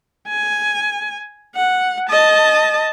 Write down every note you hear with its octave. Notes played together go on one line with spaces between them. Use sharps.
G#5
F#5
D#5 A5